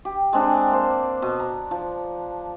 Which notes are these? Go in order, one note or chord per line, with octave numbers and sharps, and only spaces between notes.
G4
G#3 C4 D4
A#3 C5
B2
A#5
F3